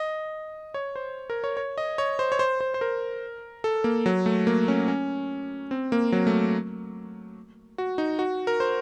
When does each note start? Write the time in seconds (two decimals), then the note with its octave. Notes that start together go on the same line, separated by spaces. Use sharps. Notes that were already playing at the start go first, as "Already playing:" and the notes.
Already playing: D#5
0.74 C#5
0.96 C5
1.30 A#4
1.44 C#5
1.57 C#5
1.78 D#5
1.98 C#5
2.19 C5
2.32 C#5
2.39 C5
2.61 C5
2.74 C5
2.81 A#4
3.64 A4
3.84 A#3
4.06 F#3
4.26 A3
4.47 A#3
4.68 C#4
4.88 C#4
5.71 C4
5.92 A#3
6.12 F#3
6.27 A3
7.78 F#4
7.98 D#4
8.19 F#4
8.47 A#4
8.60 C5